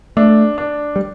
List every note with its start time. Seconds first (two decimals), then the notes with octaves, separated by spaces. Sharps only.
0.17 A3 D4
0.58 D4
0.96 G3